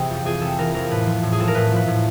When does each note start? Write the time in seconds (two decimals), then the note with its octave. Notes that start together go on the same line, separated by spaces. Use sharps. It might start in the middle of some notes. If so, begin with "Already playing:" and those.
Already playing: C3 E3 G#4
0.10 F2
0.25 F2 G#4
0.41 C3 A4
0.58 E3 A#4
0.74 F2 A#4
0.90 A2 B4
1.06 F3
1.23 A2
1.33 G#4
1.39 F3 A4
1.48 A#4
1.55 A2 B4
1.72 F3 B4
1.87 A2